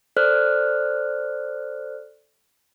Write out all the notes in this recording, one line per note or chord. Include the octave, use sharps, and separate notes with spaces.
A4 C5 D5 F6 F#6